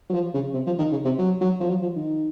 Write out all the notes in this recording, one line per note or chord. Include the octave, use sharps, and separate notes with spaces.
F#3
F3
C#3
C3
F3
D#3
C#3
C3
F#3
F#3
F3
F#3
F3
D#3